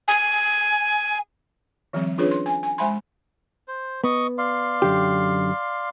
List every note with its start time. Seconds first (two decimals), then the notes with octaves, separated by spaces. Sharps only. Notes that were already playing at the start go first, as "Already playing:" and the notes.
0.08 G#5
1.93 D#3 F3 G3 C4
2.18 C#4 D4 F4 G#4 B4 C#5
2.31 C6
2.46 G#5
2.63 G#5
2.78 G#3 C5 E5 G#5 B5 C6
3.68 C5
4.04 B3 D#5 C#6
4.38 D5 F5 C6
4.82 F#2 D3 G4